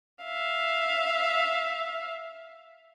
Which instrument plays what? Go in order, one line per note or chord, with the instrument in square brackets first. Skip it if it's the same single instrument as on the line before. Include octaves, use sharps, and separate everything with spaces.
[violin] E5 F5